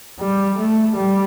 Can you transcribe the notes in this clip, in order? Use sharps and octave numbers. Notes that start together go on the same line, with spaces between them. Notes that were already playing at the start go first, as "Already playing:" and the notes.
G3
A3
G3